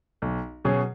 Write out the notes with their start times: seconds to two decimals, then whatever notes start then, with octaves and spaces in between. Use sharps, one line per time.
0.22 B1
0.65 B2 F#3 C#4 G#4